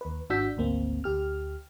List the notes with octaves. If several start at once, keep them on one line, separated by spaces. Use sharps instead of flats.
D#2 B4
G#1 D4 F#4 E6 G6 B6
G#1 D2 A#3 C4
D2 G4 F6